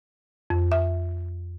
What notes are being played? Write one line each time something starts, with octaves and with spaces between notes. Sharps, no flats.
F2
E5